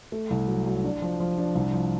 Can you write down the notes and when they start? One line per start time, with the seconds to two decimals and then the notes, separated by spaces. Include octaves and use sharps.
0.12 A3
0.30 C2
0.48 F#3
0.66 F#3
0.84 D4
1.02 F3
1.20 F3
1.38 D4
1.55 C2
1.73 F3